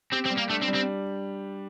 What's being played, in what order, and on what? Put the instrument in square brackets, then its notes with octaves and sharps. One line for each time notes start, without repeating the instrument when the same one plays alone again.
[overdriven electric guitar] C4 [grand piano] G4
[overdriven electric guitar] C4
[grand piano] G3
[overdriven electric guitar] A#3
[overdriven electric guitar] A3 [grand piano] D4
[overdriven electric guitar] C4
[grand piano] G3
[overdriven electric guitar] C4